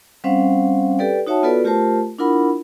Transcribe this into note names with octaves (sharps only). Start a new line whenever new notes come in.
G3 C4 C#4 C5 F5 F#5
G4 A4 B4 D5 G5
D#4 F#4 C#5 E5 F#5 A5
B3 F4 F#4 A4 B4 D5
A3 F4 G4 A#4 C5 A5
D4 E4 F4 A#4 F#5 B5